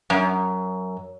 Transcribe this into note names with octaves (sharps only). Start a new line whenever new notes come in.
F#2